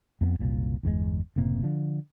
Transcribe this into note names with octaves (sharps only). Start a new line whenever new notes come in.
F2 A3 B3
F#1 C2 A#2
G1 E2 C3 G#3
F#1 A2 C3 A#3
D3 F3